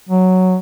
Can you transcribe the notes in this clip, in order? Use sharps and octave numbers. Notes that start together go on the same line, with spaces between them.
F#3